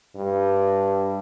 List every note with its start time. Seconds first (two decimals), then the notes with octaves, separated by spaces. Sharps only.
0.15 G2